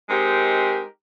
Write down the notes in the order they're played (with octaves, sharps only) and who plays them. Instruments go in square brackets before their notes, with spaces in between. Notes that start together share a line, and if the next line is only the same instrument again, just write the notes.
[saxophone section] G#3 C4 D#4 G4 A#4